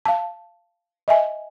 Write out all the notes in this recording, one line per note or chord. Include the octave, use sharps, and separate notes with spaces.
F5 A5
D#5 E5 G#5